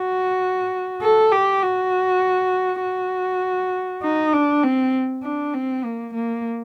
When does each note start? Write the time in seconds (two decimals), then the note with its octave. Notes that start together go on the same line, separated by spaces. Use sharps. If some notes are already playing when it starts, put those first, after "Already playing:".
Already playing: F#4
1.02 A4
1.32 G4
1.62 F#4
2.82 F#4
4.03 D#4
4.33 D4
4.63 C4
5.23 D4
5.54 C4
5.84 A#3
6.14 A#3